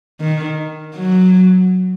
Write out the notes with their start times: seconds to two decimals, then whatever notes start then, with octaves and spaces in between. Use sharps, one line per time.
0.21 D#3
0.94 F#3